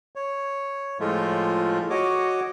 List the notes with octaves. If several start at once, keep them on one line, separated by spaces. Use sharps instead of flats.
C#5
A2 F3 G#3 A3 F4
F#4 C#5 D#5 D6